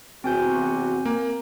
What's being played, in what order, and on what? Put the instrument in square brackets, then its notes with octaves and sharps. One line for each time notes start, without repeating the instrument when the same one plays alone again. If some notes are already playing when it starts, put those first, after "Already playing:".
[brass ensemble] E2 C3 F#4 [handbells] C4 G#5 G6
[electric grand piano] A#3